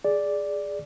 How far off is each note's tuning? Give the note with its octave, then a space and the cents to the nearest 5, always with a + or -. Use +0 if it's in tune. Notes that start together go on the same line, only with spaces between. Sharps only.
G#4 +0 D5 +0